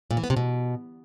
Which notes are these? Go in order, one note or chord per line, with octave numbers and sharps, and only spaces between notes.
A#2
E3
B3
C3
B2